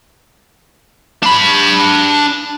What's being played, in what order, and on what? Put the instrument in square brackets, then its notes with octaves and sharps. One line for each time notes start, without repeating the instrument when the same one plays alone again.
[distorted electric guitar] D4 B5